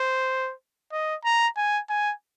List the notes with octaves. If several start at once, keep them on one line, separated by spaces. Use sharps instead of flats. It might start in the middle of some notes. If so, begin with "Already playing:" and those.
Already playing: C5
D#5
A#5
G#5
G#5